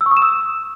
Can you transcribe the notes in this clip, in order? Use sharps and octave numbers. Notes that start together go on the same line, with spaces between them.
E6
C#6
D#6
E7
E6